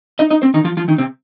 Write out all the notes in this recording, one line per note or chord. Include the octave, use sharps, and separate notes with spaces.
D#4 D#5
D#4 D#5
C4 C5
D#3 D#4
F3 F4
F3 F4
D#3 D#4
C3 C4